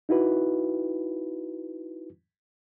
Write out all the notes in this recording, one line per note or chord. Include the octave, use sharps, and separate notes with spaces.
D#4 E4 F#4 B4